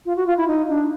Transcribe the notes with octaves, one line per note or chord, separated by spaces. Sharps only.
F4
F#4
F4
E4
D#4
D4